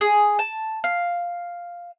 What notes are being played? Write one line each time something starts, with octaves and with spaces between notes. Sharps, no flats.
G#4
A5
F5